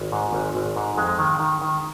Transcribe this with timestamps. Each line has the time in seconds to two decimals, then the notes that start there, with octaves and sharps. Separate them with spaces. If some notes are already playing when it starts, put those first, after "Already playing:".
Already playing: G#1
0.12 G#2
0.33 G#1
0.55 G#1
0.76 G#2
0.97 F2 G#3
1.18 D#3
1.40 D#3
1.61 D#3